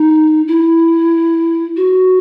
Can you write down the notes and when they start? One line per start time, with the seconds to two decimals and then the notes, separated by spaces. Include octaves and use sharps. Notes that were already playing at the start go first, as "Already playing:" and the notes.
Already playing: D#4
0.47 E4
1.76 F#4